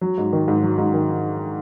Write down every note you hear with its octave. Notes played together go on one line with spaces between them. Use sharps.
F#3
G#2
D#3
G#2
F#3
G#2
D#3